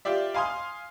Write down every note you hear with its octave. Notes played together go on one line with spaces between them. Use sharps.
F4 G4 D5 E5
F5 G#5 C6 D#6 F6